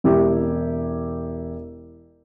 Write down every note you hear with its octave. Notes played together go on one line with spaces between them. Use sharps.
E1 E4 G4